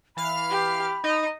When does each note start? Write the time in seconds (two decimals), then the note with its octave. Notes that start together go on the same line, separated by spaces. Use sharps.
0.17 E3 F5 B5 F6
0.49 G4
1.04 D#4 D#5